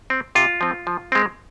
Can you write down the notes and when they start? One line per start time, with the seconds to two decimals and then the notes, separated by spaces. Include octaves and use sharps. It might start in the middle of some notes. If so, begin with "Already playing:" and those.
0.10 C4
0.35 C3 F4
0.61 F3 C4
0.87 F3
1.12 G#3 C4